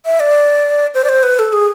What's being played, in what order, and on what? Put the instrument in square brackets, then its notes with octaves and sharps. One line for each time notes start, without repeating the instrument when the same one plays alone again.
[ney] E5
D5
C5
D5
C5
B4
A4
G#4